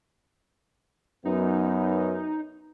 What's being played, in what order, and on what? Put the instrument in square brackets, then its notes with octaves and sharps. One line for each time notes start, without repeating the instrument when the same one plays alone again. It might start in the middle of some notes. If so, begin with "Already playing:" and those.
[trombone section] F#2 B3 [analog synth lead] D#4